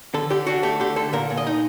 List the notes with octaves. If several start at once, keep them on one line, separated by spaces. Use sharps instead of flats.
D3 A4
D3 G4
D4 F#4
A3 G4
D3 G4
D3 A4
A#2 A#4
A#2
D#5
D#4